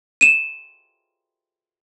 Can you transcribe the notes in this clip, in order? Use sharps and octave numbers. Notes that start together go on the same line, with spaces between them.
D#7 E7